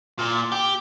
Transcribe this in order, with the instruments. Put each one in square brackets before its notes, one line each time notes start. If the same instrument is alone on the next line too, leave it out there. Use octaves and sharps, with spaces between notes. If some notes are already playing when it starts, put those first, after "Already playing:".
[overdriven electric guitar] A#2
G4